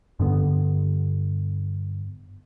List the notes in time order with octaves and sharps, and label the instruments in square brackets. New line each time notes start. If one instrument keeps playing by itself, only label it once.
[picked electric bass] G2 D3 B3